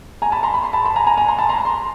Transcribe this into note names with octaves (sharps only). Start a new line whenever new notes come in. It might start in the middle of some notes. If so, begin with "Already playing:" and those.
G#5 A#5
A5 B5
A#5 C6
B5
C6
A5 B5
A5 B5
G#5 A#5
G#5 A#5
G#5 A#5
A#5 C6
A5 B5
A#5 C6
C6